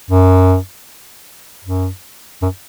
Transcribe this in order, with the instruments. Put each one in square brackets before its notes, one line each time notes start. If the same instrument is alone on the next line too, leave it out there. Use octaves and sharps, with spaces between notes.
[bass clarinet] F#2
F#2
F#2